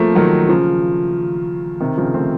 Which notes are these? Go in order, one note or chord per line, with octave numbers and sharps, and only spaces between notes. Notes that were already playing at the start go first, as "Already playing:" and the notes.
Already playing: F3 A3 A#3 C4
D#3 F#3
C#3 F3
C3 D#3
C#3 F3
A3 C4